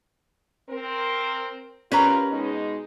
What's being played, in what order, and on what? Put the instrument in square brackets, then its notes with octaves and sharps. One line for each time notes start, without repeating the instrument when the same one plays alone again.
[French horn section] C4 A#4
[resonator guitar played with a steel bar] C#4 B4 A#5 [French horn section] F4 G4 A#4
[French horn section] B2 G#3 D#4